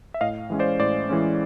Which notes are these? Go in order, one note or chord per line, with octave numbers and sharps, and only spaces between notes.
E5
A2 D#5 F5
E3 G#3 C#4
C5 D5
A2 C5 D5
E3 G#3 C#4